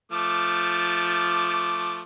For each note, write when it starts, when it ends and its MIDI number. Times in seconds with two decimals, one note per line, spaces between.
0.12 2.01 53
0.12 2.01 57
0.12 2.01 86